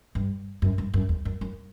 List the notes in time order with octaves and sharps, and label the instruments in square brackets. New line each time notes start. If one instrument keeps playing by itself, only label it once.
[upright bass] G2
F#2
G2
F#2
E2
F#2
F#2